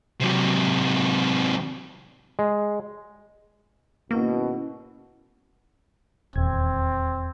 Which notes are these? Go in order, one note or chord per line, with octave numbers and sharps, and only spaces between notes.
C3 F#3
G#3
G#1 B2 A#3 C#4 E4
D#1 E2 C4 G#6